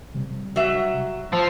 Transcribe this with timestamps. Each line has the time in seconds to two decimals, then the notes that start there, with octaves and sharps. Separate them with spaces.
0.15 C3 G3
0.56 F#3 E5
1.33 F3 A5 E6 A6